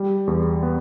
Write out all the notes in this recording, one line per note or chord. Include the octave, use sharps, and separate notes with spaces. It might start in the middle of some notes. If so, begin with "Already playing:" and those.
Already playing: G3
E2
B3